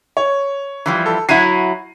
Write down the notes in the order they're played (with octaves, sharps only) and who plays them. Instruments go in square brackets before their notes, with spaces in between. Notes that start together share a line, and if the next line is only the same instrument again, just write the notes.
[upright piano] C#5
[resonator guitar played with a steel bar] E3 F3 G3
[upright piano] A4
[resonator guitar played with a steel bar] F#3 E4 F#4 [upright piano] C7 D#7